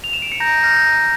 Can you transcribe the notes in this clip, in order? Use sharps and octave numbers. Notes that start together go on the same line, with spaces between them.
F7
E7
D7
C#7
A#5 G6 A#6
F6 G6 A#6
A#5